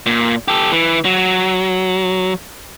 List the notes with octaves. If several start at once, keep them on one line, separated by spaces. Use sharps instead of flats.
A#2
G4 A4
E3
F#3